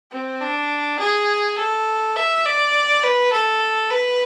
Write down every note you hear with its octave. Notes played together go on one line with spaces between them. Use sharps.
C4
D4
G#4
A4
E5
D5
B4
A4
B4